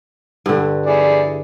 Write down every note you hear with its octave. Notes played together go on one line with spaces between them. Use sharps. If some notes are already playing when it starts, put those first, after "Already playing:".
G2 D3
E4 G#4 D5